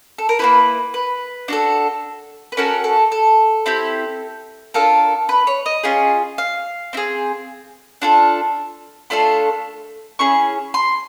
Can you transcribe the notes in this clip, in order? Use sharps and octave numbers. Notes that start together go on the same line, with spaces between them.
A4
A#4
A#3 C#4 E4 B4
B4
D4 F#4 A4
B4
C#4 F#4 A4 A#4
A4
A4
C4 E4 G4
D4 F4 A4 A#4
B4
C#5
D#5
C#4 F4 G#4
F5
C4 E4 G#4
D4 F4 A4
A3 D4 F4 A4 C6
C#4 E4 G#4 C#6
C6